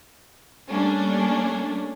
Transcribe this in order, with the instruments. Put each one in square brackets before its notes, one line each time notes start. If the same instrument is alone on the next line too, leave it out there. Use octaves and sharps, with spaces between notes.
[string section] G3 A3 A#3 C#4 D4